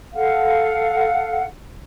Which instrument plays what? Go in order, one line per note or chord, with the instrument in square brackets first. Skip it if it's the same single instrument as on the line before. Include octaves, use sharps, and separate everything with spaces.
[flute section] A4 F5 F#5